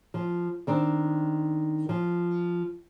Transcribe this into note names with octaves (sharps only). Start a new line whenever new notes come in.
F3
D#3 C4 D4
F3